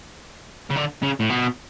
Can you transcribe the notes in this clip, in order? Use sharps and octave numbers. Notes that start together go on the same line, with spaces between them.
C#3
D3
C#3
A2
B2